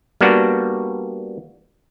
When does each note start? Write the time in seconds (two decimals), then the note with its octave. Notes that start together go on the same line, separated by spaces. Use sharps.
0.21 G3 A#3 B3 D4 F#4